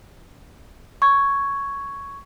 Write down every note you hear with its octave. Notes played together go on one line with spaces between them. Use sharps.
C#6 G#6